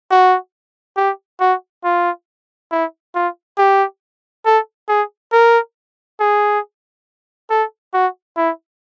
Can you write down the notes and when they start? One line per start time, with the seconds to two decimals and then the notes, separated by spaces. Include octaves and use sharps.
0.11 F#4
0.97 G4
1.40 F#4
1.84 F4
2.72 E4
3.15 F4
3.58 G4
4.46 A4
4.89 G#4
5.32 A#4
6.20 G#4
7.50 A4
7.94 F#4
8.37 E4